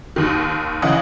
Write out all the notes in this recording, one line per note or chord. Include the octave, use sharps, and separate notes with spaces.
D#2 D#3
C#3 E3 D#5 F#5